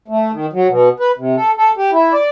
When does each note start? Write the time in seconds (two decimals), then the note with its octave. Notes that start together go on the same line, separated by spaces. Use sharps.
0.08 A3
0.32 D#3
0.53 F#3
0.68 B2
1.00 B4
1.18 C3
1.37 A4
1.57 A4
1.77 G4
1.92 E4
2.13 D5